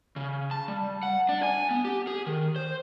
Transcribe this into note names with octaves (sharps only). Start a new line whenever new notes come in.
C#3
A5
G3
F#5
D4
G#5
B3
G4
G#4
D#3
C5